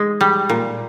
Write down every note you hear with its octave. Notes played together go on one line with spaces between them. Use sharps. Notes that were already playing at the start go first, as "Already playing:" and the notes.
Already playing: G#3
G3
A#2